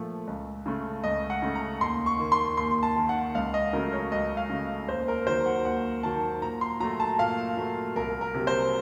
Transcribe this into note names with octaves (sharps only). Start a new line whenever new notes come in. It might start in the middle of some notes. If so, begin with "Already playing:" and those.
Already playing: A#2 F3 A3
C#2
C#3 A3
C#2 D#5
F#5
C#3 A3
A#5
D#2 C6
C#6
D#3 A#3
C6
D#2 C6
A5
D#3 A#3
F#5
C#2 F5
D#5
C#3 F#3 A3 A#4
C#5
C#2 D#5
F5
C#3 F#3 A3
D#2 C5
A#4
D#3 F#3 A#3 C5
F#5
D#2 F#5
D#3 F#3 A#3 A5
A#2 A#5
C6
F#3 A3 A#5
A5
A#2 F5
F#3 A3
C2 A#4
A#4
C3 F#3 A#3
C5